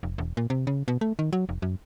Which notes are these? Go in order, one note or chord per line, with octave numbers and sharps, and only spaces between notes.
F1
E1
A#2
C3
C#3
B2
A3
D#3
F#3
F1
F#2